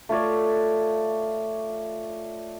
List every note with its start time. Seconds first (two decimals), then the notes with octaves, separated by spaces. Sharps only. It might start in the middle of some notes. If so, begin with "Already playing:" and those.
0.09 A3 F4 C#5 D5